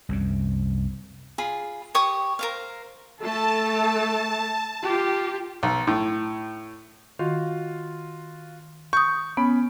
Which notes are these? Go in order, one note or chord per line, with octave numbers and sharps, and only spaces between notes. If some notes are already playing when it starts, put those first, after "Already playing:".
C2 F#2 C3
F4 G#4 B5
G4 C#5 C#6 D#6
A#4 C5 F5
A3 A4 A5
F4 G4
B1
A2
D#3 F4 F#4 F5
C#6 D#6 G6
B3 C#4 B5